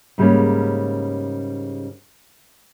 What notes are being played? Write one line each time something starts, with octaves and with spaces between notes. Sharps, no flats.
G#2 C#3 G3 G#3 A#3 C#4